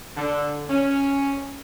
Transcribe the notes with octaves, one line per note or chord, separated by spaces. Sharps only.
D3
C#4